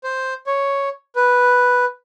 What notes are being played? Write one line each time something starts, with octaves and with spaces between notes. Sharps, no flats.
C5
C#5
B4